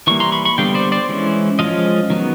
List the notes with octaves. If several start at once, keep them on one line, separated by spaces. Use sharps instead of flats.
E3 G3 A#3 C#6
A#5 C6
B5 C#6
B5 C#6
D3 G3 B3 F5 G5
C5 D5
C5 D5
E3 G#3 C#4
F3 G#3 C#4 D#5 F5
D#3 F#3 B3